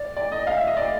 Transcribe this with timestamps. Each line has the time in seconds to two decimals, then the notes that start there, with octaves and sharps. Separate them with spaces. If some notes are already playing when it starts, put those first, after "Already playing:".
Already playing: D5
0.16 D5
0.32 D#5
0.47 F5
0.57 E5
0.67 D#5
0.77 D5